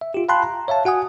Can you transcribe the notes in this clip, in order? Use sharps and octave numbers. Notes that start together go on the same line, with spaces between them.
E5
F4 G4
F5 G5 A5 B5 C6 F#6
A#5
C#5 E5 F5 A5
F#4 F#5 G#5 D#6